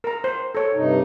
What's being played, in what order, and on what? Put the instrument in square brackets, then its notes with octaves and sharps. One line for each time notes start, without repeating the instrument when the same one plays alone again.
[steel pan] A#4 A#5
C5
A4 C#5
[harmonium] G2 C3 D#4